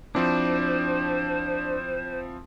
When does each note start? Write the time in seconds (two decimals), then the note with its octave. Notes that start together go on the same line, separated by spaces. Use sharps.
0.15 F3 C4 D4 E4 C5